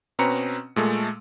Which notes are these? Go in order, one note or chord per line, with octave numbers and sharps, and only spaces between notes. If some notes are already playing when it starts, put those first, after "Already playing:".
B2 C4 C#4 B4 A#5 C#7
A#2 G#3 A3